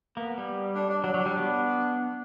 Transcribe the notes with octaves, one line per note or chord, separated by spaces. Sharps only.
A#3 B3
G3
D4
D4
F#3 D4
F#3
G3
B3